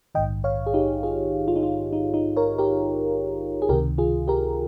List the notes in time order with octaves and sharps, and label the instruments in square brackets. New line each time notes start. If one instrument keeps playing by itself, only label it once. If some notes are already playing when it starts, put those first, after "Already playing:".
[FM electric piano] A#1 G#2 D#3 D#5 G5
C#5 F5
G#4
D#4 G4
F4 G#4
F4
D#4
F4
D#4
D#4
A#4 C#5
G4 A#4
G#4
C#2 C3 D#3 G4 A#4
F4 G#4
G4 A#4